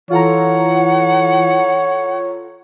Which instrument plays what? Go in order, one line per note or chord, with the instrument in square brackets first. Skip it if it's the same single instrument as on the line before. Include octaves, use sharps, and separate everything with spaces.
[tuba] E3 [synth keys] F4 A4 A#5 [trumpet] C#5 [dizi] F#5